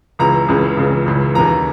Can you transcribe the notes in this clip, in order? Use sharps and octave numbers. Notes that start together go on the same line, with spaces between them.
C#2 C#3 E3 A#5
C#2 C#3 E3
C#2 C#3 E3
C#2 C#3 E3
D#2 C#3 E3 A#5